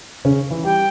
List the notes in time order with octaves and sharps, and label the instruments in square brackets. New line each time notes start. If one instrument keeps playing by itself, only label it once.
[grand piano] C#3 C#4
E3 E4
[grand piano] G3 G4 [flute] G5